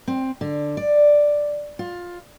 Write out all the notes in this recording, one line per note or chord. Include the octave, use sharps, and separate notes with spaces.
C4
D3
D5
F4